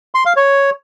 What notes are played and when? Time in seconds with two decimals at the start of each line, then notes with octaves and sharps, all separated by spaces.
0.15 C6
0.26 F5
0.36 C#5